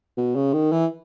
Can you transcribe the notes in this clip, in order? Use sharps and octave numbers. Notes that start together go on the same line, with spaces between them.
B2
C#3
D#3
E3